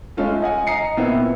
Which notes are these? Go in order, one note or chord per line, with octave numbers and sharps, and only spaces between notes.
G#3 A3 C#4 F4 A4
D#5 F#5 G#5
D#5 A#5 C7 C#7
A#2 B3 C4 E4